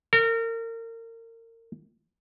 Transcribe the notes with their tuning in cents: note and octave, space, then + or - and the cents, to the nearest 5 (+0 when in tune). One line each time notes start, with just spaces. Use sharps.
A#4 -30